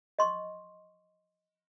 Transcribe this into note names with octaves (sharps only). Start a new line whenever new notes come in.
D#5 C6 C#6